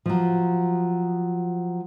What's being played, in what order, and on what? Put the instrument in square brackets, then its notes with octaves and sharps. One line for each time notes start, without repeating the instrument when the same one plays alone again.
[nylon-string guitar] F3 F#3